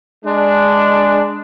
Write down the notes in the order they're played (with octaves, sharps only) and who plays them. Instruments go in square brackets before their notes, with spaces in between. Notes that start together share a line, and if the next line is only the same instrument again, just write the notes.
[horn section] G#3 D4